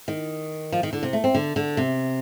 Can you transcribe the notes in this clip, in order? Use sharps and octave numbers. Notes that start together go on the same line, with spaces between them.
D#3
F3
D#3
D3
C3
A3
C4
D3
D3
C3